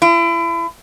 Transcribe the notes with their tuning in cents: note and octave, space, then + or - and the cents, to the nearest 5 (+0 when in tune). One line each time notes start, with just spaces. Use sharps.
E4 +35